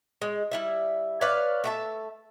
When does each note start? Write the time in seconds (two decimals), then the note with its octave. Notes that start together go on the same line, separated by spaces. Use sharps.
0.22 G#3
0.51 G3 E4 E5
1.21 B4 C#5 D5 F5
1.64 A3 E5 A5